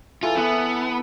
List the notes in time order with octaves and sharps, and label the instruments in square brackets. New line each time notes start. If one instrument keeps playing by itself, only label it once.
[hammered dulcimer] E3 A4 [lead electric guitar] F4
[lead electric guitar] B3 [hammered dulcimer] E4